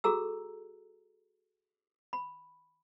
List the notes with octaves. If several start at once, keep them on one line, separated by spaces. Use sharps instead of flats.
F#4 G#4 A4 A#5 E6
B5